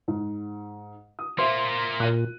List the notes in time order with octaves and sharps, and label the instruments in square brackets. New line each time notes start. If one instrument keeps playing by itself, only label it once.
[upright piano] G#2
D#6
[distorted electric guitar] A#3 F4 [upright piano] C5 E5 [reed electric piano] C6
[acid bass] A#2 [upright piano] F#6 D#7